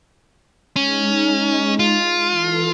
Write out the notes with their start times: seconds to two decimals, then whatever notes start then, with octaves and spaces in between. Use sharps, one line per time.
0.76 G#3 C#4 D#4
1.79 F4
2.29 E3 A4